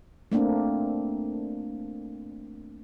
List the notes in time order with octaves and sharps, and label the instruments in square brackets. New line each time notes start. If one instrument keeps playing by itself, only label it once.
[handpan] A3 A#3 C4 D4